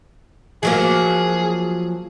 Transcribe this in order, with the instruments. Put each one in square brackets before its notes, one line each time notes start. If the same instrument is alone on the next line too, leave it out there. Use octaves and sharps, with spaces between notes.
[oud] F3 F#3 A#3 [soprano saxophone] G#4